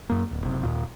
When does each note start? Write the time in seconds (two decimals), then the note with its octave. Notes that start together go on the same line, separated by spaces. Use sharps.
0.10 F#2 A#3
0.31 D1
0.44 F#1 C3
0.63 D#2 A#2